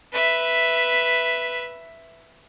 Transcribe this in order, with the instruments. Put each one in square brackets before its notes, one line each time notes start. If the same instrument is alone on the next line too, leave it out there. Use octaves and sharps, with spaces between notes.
[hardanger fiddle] B4 E5